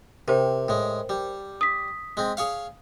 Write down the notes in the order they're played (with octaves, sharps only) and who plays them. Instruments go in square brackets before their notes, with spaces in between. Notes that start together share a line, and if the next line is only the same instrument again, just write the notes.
[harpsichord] C3 [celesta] A#4 C5 G5
[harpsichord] A2 G#3
G3
[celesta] D#6 B6
[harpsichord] G#3 C4
G#4 C#5 F5